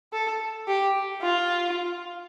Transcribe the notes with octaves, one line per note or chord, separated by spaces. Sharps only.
A4
G4
F4